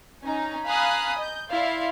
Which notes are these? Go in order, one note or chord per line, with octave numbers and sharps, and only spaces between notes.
C#4 D#4 G#5 A#5
F5 G#5 A#5 B5 D#6 F#6
D#5 G6
E4 D5 F5 C6